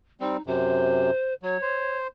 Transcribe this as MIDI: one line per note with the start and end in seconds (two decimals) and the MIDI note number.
0.21 0.37 55
0.21 0.37 60
0.21 0.41 63
0.47 1.11 42
0.47 1.11 48
0.47 1.33 72
1.43 1.58 54
1.43 1.97 73
1.62 2.07 72